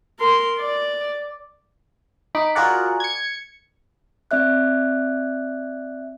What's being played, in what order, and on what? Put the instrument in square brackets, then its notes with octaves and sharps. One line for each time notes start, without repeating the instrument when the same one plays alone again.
[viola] A#4 C6
D5
[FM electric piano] D#4 B5 D6
F4 F#4 G#4 A#4 D5 F#5
G#6 C#7
[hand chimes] C4 D5 E5 F#6